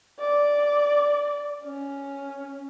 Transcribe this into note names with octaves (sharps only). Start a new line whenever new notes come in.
D5
C#4